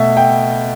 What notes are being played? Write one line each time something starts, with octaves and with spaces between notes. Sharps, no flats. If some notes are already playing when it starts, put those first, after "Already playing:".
Already playing: B2 A3 E5
G5